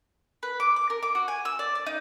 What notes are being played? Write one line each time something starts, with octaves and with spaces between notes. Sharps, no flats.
B4
D6
D6
A#4
D6
F#4
G#5
E6
D5
D5
D#4